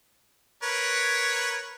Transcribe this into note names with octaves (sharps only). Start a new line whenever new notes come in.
A#4 B4 C#5